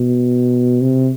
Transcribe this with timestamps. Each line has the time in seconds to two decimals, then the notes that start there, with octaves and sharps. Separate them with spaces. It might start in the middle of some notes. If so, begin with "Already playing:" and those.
Already playing: B2
0.82 C3